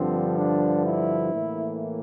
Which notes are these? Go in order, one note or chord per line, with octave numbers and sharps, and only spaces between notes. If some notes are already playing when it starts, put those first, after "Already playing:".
Already playing: G2 D3 F3 C4
D4
E4
A2 E3 A#3